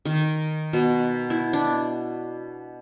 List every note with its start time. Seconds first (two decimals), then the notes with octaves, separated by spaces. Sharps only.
0.05 D#3
0.73 B2
1.30 E4
1.53 D4